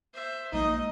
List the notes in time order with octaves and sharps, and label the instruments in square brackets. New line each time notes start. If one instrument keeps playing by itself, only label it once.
[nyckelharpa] C5 E5
[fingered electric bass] A#1 G#3 A#3 [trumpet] D#4 [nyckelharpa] D#5